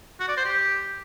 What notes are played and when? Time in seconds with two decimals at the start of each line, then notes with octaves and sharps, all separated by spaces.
0.20 F#4
0.28 D5
0.37 C5
0.46 G4